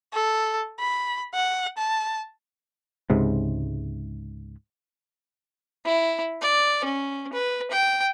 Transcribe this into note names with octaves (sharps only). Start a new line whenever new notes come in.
A4
B5
F#5
A5
C#2 G#2 C3
E4
D5
C#4
B4
G5